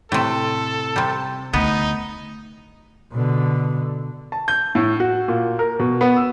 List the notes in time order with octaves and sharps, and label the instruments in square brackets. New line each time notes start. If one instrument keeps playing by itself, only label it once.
[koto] A2 C3 [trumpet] A4
[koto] C3 G3
[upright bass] D2 A3 [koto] B3 [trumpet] D#4
[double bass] B2 D3
[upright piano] A5
G6
A2
F#4
A#2
A#4
B2
B3
E6